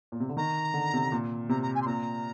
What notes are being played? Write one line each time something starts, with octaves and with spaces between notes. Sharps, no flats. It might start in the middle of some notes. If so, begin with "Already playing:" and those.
A#2
C3
D3
D#3 A#5
D3
C3
A#2
C3 A#5
A#5
G#5
C6
A#2 A#5